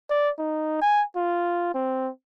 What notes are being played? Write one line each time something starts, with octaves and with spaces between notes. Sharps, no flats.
D5
D#4
G#5
F4
C4